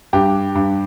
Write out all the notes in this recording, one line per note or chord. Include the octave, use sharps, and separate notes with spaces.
G2 G4
G2